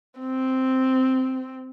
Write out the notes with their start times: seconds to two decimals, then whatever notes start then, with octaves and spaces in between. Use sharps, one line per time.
0.20 C4